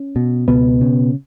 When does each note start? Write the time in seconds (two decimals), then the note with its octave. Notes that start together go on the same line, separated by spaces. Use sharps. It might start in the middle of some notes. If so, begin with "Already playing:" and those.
Already playing: C#4
0.16 B2
0.48 C#2 B2 B3
0.81 C#3